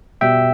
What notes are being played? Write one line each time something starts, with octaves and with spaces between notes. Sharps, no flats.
B2 G3 E5 G5